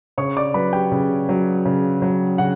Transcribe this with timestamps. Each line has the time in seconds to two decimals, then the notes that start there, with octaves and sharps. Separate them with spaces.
0.18 C#3 C#5 C#6
0.37 D5 D6
0.54 F#3 B4 B5
0.73 G4 G5
0.92 C#3
1.29 F#3
1.66 C#3
2.02 F#3
2.38 C#3 F#4 F#5